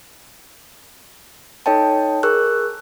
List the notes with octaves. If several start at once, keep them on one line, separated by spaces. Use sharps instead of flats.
D#4 A4 C#5 D#5 G5 A5
G#4 A#4 C#6 E6 F#6